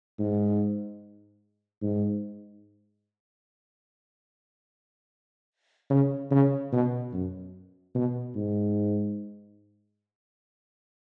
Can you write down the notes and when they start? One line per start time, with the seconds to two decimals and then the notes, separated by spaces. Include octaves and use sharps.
0.19 G#2
1.82 G#2
5.90 C#3
6.31 C#3
6.72 B2
7.13 F#2
7.95 B2
8.35 G#2